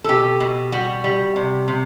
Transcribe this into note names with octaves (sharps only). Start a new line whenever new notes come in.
A4
B2 G4
B2
G3 F#4
G3
C3
C3